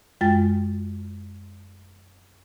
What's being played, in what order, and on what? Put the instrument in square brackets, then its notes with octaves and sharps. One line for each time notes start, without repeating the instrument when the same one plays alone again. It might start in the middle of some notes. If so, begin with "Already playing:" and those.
[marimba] F#2 G#3 F4 G5 A6